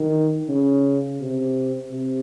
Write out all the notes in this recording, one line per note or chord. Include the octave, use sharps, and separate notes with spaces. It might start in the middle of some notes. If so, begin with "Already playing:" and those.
Already playing: D#3
C#3
C3
C3